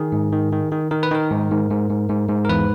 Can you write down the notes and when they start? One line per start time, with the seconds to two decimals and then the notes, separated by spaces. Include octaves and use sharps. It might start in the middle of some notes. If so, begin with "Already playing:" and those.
Already playing: D#3 G#4
0.12 G#2
0.32 D#3
0.52 D#3
0.72 D#3
0.91 D#3 A#4
1.03 B4
1.11 D#3 A#4
1.31 G#2
1.51 G#2
1.70 G#2
1.90 G#2
2.09 G#2
2.29 G#2
2.45 A#4
2.49 E2 B4